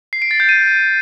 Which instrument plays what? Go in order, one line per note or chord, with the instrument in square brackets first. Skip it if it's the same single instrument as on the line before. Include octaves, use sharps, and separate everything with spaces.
[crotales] C7
D7
A6
G6
D#7